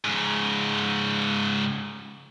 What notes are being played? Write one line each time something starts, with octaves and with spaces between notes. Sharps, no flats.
G#2 C#3